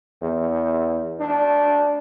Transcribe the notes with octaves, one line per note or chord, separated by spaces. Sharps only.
E2
D4